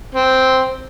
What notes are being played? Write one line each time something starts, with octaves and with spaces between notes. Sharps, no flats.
C4